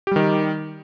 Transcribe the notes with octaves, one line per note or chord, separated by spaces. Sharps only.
D#3 G3 G4